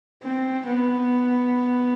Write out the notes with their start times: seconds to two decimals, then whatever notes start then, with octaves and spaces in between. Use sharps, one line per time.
0.22 C4
0.66 B3